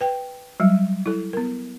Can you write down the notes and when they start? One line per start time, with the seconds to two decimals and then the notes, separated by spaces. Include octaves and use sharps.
0.01 B4 G5
0.60 F#3 G3
1.06 E4 A4
1.33 B3 A#4